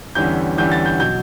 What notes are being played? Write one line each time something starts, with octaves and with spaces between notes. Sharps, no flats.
E2 D3 G3 C#4 E4 G6
E2 D3 G3 C#4 E4 G6
A6
G6
B2 F#3 G6